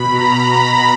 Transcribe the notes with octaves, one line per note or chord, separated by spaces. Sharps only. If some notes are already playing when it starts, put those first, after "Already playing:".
Already playing: B2 B5
A#5
B5